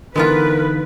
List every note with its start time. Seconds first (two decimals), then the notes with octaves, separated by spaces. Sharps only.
0.16 D3 E3 G#3 B3 D#4 F4 A#4 B4